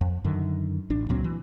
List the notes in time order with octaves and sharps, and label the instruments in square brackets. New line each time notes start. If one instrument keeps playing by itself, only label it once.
[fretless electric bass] F2
F#2 D3 D#3
A1 D4
C#2 A#2 F#3 C4
E3